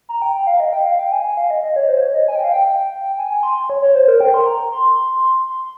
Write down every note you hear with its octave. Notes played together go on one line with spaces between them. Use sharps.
A#5
G5
G5
F5
D#5
G5
F5
G5
G#5
G#5
F5
D#5
D#5
C#5
C5
C#5
D#5
G#5
G5
F5
G5
G#5
G#5
C6
C6
C#5
C#5
C5
A#4
G5
C6
A#5
C6
C6